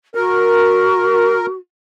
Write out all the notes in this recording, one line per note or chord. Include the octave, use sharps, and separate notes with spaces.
F#4 A#4